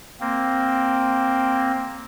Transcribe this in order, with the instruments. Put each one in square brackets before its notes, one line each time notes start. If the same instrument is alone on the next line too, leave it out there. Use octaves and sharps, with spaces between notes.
[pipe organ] A#3 C4